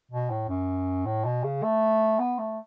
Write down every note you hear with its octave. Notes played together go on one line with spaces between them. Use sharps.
B2
A2
F#2
A2
B2
C#3
A3
B3
A3